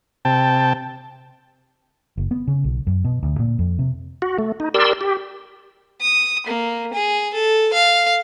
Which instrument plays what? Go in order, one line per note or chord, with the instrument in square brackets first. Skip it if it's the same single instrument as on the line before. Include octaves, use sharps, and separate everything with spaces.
[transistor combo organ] C3 G5 A5
[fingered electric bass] F#1
B3
C#3
B1
F#2
B2
D2
A#2
F2
C3
[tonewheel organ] F#4
A3
D#4
G4 A#4 D5 C6 E6
G4
[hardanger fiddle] D#6
A#3
G#4
A4
F5